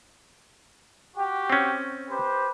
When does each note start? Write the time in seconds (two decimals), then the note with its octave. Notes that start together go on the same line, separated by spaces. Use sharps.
1.16 F#4 G4
1.50 C4 C#4
2.09 G4 B4 C5